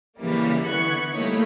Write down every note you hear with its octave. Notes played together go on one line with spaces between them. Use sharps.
C#3 E3 G3 A#3
D3 E3 B3 C#6 F#6 G#6
G3 A3 A#3 D#4 E4 C#5